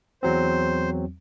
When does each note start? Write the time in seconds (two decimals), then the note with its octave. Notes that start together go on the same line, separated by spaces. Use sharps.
0.23 E2 F#3 C4 C5